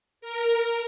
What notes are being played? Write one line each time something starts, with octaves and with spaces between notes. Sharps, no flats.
A#4